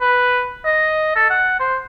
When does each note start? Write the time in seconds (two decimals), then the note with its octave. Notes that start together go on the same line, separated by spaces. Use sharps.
0.01 B4
0.65 D#5
1.16 A4
1.30 F#5
1.60 C5